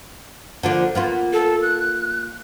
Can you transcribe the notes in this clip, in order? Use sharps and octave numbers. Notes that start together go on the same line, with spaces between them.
D3 F3 A#3
A#3 B3 F4
A4
F#6